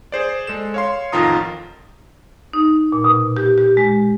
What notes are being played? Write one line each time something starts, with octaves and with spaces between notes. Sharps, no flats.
G#4 C5 D5
G#3 A4 E7
C#5 F5 C6
A1 F2 D#3 F4 A#5 D#6
D#4
A#2
B2
G4
G4
G#3